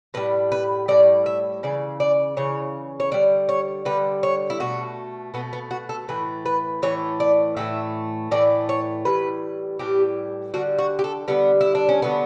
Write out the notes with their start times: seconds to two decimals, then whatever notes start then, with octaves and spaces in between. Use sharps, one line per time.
0.14 A2 G3 B4
0.52 B4
0.88 A2 G3 D5
1.26 E5
1.63 C#3 E3 D5
2.00 D5
2.37 C#3 E3 C#5
3.00 C#5
3.11 D3 G3 D5
3.49 C#5
3.85 D3 G3 B4
4.23 C#5
4.50 E4
4.60 B2 A3 F#4
5.34 B2 A3 B3
5.53 B3
5.71 F#4
5.89 A4
6.08 A2 E3 A3 B4
6.46 B4
6.82 A2 E3 A3 C#5
7.20 D5
7.57 A2 E3 A3 E5
8.31 A2 E3 A3 D5
8.69 C#5
9.05 A2 E3 G3 B4
9.79 A2 E3 G3 G4
10.54 D3 G3 F#4
10.79 F#4
10.99 G4
11.04 A4
11.28 D3 G3 B3
11.61 E4
11.75 D4
11.89 C#4
12.02 D3 F#3 A3 B3